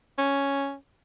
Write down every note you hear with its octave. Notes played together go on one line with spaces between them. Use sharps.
C#4